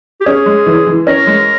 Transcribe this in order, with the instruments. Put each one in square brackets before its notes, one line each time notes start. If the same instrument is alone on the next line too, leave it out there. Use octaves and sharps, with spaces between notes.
[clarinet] G4
[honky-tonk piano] C#4 [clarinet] G#4
[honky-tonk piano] G#3
E3
E3
[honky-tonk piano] C#4 [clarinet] A#4
[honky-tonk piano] G#3